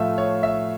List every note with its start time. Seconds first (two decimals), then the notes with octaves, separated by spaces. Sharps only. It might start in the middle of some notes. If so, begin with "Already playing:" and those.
Already playing: A2 F3 A3 E5 F5
0.18 C#5
0.43 E5